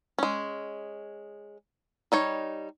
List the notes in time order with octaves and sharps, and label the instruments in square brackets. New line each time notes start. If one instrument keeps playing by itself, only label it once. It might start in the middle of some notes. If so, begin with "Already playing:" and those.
[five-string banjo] G#3 C#4
G3 D#4 C#5